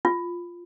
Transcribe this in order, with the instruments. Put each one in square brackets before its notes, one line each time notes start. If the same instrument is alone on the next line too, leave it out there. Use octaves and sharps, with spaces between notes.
[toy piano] F4